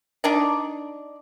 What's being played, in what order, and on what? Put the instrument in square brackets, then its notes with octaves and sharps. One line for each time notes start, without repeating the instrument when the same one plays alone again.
[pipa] D4 D#4 D5